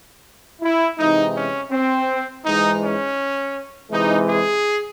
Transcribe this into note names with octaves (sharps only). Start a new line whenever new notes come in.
E4
C3 E3 G#3 D#4
C#4
C4
G#2 E3 G#3 D#4
C#4
C3 E3 G#3 D#4
G#4